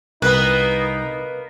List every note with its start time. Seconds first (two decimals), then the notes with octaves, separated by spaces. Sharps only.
0.22 C2 A#3 B3 D#4 B4